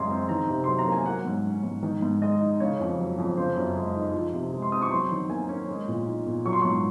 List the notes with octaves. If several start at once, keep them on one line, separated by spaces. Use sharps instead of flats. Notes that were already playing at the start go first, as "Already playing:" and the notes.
Already playing: F#2 C#3 G#3 G#5 A#5 C6
C4
D#3 A#5
C3
F#3 C6
A#5
A#3
G#5
F#3 F#5
G#2
C#4
G#2
D#3
G#2
G#3 D#5
D#4
C#3 C#5
F2
F#3
F2
C#3 C5
F#2
G#3
D#4
F3
C3
G#3
C6
C4 D#6
C#6
F#3 C6
D#3
A#3 G#5
C#4
G#3
A#2
D#4
A#2
F#3 C#6
C6
C#6
G#2